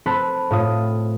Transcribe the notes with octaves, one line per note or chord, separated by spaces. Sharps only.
C4 A4 B5 F#6
A2 F4 D#6